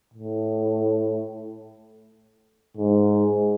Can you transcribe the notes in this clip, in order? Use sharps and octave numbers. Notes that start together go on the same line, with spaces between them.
A2
G#2